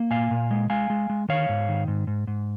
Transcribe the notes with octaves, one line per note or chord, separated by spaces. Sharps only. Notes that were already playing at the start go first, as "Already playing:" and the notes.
Already playing: A#3
A#2 F5 G#5
A#2
G#3
G#3 F5 G#5
G#3
G#3
D#3 C#5 F5
G#2
D#3
G#2
G#2
G#2